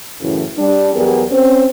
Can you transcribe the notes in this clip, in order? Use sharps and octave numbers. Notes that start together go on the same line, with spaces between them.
F#2 A2 C#3 E3
G3 D4
E2 F#3 B3 G4 G#4 A#4
C4 C#4 C5